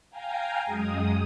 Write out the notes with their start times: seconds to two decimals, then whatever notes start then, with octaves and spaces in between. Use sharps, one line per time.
0.11 F5 G5 G#5 A#5
0.66 F#2 G#3 D#6